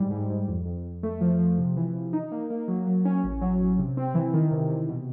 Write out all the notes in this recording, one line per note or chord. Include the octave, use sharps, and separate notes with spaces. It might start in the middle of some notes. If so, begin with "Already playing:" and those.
Already playing: G#2 G3
G#2
G#2
F2
F2
F2
A3
F3
F3
C3
E3
C3
D#4
A#3
A#3
F#3
F#3
C#4
A1
F#3
A1
C3
C4
E3
D#3
C3
C3
B2